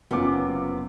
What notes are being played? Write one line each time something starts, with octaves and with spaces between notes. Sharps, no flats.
F#1 C3 B3 C#4 F4 D6